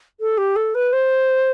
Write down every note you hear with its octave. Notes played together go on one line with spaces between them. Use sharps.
A4
G4
A4
B4
C5